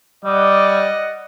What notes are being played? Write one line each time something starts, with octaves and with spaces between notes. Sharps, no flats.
G3 D5 D#5 F#5